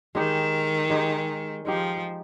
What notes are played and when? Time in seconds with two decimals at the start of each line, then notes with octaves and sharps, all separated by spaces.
0.15 D#3 G#3 D#4 G4
0.90 G#3 D#4 G4
1.65 F3 G#3 D#4 G4